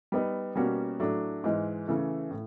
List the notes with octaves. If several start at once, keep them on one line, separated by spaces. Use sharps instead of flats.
G3 B3 D#4
B2 G3 A#3 C#4 F#4
A2 F#3 A3 D4
G#2 E3 G#3
C#3 E3 A3
A2